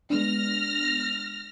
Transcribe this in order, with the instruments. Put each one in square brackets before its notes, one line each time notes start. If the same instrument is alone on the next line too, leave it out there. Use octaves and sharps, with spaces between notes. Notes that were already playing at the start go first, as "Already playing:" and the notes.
[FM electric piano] G#3 B3 D4 [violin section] F6 A#6